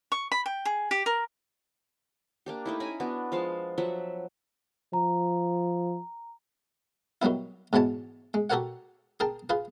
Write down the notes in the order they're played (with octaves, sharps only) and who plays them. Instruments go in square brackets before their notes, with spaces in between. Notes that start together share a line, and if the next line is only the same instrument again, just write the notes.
[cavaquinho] C#6
B5
G5
G#4
G4
A#4
[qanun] A#3 D4 G4
A3 D#4 E4
C#4 G#5 A#5 B5
B3 D4 F#4
F3 G#3 F5 A5
F3 F#3 E5 F#5
[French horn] F3 [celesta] A#5
[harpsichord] D#3 F#3 G3 B3 E4
G#2 B2 E3 C#5 A5
G#3
F#4 G4 A4 A#4 C#5 F#5
G#4 A#4 G5 A5
F4 G#4 B4